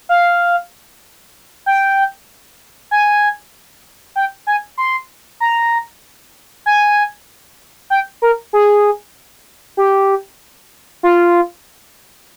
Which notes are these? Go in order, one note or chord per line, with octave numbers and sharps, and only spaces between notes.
F5
G5
G#5
G5
G#5
C6
A#5
G#5
G5
A#4
G#4
G4
F4